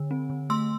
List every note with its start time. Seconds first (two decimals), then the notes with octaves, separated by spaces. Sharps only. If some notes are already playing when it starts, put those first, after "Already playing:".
Already playing: D3
0.11 C4
0.30 D3
0.50 A3 C6 E6